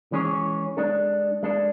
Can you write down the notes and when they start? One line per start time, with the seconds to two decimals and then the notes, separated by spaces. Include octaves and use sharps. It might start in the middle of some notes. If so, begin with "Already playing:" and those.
0.12 E3 G#3 C#4 G#4 C#5
0.77 G#3 D4 A4
1.43 G#3 D4 A4